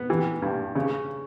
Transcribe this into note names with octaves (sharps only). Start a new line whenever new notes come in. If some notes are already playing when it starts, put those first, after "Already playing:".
Already playing: B3
E3
G2
C#3